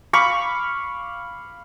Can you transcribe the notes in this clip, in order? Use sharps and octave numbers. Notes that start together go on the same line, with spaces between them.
F5 B5 C#6 D6